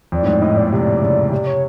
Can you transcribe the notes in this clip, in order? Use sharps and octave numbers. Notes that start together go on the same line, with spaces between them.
F2 D5
A2
G#2 D5
A2 D#5
A#2 D5
C3 D5
C#3
C3 D5
C#5